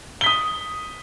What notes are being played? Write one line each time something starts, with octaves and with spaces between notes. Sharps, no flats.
D#6 B6 G7